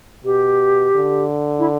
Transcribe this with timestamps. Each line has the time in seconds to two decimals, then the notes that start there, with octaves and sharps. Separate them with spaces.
0.24 B2 G4
0.96 D3
1.59 E4